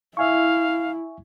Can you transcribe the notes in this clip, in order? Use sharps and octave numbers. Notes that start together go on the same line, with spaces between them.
E4 E5 F5 G#5 C#6